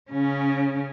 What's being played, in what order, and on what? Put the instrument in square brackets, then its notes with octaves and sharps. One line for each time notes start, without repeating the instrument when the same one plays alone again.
[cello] C#3 C#4